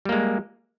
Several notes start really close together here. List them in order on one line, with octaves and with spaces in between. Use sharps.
G3 A#3 G#3